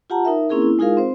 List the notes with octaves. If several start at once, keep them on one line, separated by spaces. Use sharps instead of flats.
F4 G4 F#5 A5 A#5
D#4 A#4 E5
A#3 C4 C#4 E4 G#4 A#4
E4
G#3 D#4 F4 G#4 A#4 F5
C4 C5